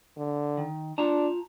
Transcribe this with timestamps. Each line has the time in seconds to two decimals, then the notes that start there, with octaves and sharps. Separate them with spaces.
0.18 D3
0.57 D#3
0.98 D4 F4 A5 A#5